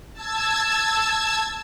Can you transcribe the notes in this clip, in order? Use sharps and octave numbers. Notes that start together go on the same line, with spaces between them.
A5 E6 G#6